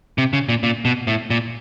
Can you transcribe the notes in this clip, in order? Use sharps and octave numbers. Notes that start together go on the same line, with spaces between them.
C3
C#3
A#2
A#2
B2
A2
A#2